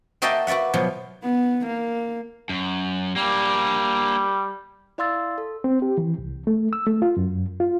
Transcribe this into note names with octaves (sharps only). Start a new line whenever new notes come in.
A#3 F#4 D#5 E5 G5 A5
F#4 B4 D5 E5 F#5
B2 F3 F#3
B3
A#3
F#2
G3 A#3 D4
E4 D5 F5 C6 E6 A6
A4
C4
G4
E3
C2
A3
E6
A3
F4
F#2
F4